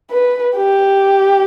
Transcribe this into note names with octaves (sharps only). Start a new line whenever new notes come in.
B4
G4